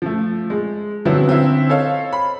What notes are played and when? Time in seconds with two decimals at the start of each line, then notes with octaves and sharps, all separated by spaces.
0.02 F3 A3
0.50 G#3
1.05 D3 F3 F#3 B3 C4 E4
1.27 D3 C4 C#4 E4
1.69 A4 C5 C#5 D#5 F5
2.13 B5